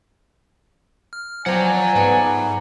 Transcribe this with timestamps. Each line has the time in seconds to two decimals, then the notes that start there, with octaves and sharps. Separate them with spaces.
1.13 F6
1.46 F3 F#3 C4 D5 F#5 G#5 A#5
1.95 G#2 A3 B3 G#4